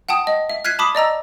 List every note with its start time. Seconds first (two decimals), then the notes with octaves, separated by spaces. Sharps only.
0.09 F#5 G5 A5 D#6
0.27 D#5
0.50 E5
0.65 F6 F#6 G#6 B6 C7 D#7
0.79 A5 B5 D6 D#6 B6
0.95 D5 D#5 A#5 E6